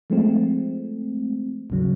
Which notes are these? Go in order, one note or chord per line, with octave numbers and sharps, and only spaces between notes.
F3 G#3 A3 C4
G#1 D#2 C#3 F#3